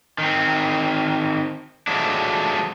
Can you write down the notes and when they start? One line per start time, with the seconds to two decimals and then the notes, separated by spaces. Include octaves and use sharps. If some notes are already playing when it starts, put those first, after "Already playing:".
0.18 D#3 C4
1.87 F3 F#3 G#3 A3 D4